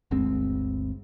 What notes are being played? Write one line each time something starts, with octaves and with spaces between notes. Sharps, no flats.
G1 D2 G#3 C4